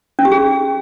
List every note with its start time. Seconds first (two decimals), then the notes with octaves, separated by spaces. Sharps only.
0.19 C#4
0.25 G4
0.32 G#4